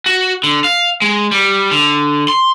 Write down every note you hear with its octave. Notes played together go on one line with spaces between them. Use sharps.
F#4
D3
F5
G#3
G3
D3
C6